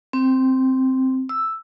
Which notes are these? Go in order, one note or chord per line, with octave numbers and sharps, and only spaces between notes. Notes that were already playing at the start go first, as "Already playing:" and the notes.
C4
E6